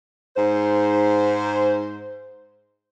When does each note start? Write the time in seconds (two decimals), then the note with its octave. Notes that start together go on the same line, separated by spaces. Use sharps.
0.36 G#2 C5